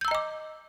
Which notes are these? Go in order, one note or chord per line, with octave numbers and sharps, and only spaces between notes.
D#5 A#5 D6 E6 G6